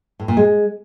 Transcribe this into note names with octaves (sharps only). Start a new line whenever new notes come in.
A2
A#2
G#3